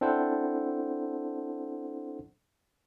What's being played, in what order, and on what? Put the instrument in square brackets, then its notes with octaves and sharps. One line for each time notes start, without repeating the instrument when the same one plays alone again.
[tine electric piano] C4 D4 E4 A4 C5 F#5